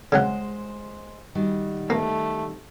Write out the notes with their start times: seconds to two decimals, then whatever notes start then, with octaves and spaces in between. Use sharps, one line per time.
0.12 C#3 F#3 G#3 C5 F#5
1.35 D#3 G3 F#4
1.90 A3 A#3